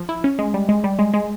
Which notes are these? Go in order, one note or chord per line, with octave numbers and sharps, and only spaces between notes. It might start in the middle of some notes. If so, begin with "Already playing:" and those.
Already playing: F3
E4
C#4
G#3
G3
G#3
G3
G#3
G#3